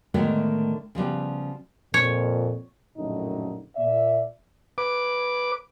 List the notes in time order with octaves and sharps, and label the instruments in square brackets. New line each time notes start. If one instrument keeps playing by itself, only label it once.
[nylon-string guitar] A2 D3 D#3 G#3 A3 B3
C#3 F3 G3 B3
[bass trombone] F2 [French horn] A#2 [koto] C#5
[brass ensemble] A#1 F#2 A2 D3 D#4
A#2 D5 E5
[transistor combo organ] B4 D6